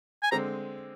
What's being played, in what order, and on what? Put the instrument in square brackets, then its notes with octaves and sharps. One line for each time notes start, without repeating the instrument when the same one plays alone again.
[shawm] G#5
[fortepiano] D3 G#3 C4 [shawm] A#5